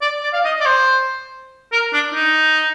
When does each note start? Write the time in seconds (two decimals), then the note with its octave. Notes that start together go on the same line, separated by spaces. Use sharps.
0.01 D5
0.23 D5
0.33 F5
0.44 D#5
0.60 D5
0.66 C5
1.72 A#4
1.93 D4
2.14 D#4